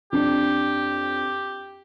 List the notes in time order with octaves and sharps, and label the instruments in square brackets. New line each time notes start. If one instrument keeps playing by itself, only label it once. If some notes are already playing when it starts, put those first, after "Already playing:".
[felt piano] F2 D4 [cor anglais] G4